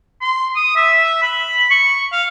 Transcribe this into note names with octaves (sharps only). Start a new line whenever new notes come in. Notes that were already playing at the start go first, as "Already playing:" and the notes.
C6
D#6
E5
B5
C#6
F5